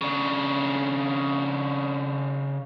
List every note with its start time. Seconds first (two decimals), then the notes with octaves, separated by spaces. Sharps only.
0.01 C#3 D4